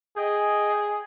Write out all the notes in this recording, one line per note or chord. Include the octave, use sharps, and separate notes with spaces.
G#4 D#5 G5